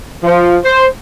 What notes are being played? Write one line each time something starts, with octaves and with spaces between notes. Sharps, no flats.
F3
C5